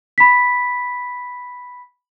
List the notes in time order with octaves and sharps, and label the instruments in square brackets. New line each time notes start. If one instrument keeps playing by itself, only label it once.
[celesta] B5 B6